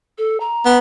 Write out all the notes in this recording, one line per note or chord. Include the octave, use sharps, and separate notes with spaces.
A4
A#5
B3